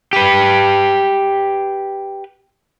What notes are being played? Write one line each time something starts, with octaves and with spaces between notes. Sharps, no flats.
G4 B4